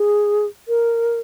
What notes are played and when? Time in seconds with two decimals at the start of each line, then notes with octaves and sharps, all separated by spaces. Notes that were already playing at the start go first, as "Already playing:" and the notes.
Already playing: G#4
0.68 A#4